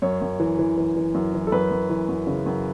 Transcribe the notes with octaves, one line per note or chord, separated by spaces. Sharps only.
F#2 C#5
F#2
E3
E3
E3
E3
F#2
E3
A4
F#2 B4
F#2
E3
F#2
C#3
F#2